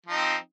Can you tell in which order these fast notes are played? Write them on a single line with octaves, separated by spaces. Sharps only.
F3 D#4 C4